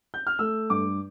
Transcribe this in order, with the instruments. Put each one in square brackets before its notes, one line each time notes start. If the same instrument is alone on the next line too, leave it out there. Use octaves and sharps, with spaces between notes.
[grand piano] G6
F6
A3 E6
G2 D6